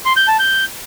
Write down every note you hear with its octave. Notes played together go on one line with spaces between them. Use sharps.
C6
G6
A5
G6